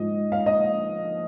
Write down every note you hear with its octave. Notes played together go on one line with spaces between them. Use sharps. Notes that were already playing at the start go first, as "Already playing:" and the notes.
Already playing: G#2 F3 D#5
F5
D#5